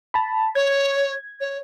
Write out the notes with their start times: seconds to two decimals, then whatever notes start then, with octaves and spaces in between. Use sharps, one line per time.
0.14 A5 B5
0.55 C#5 G#6
1.41 C#5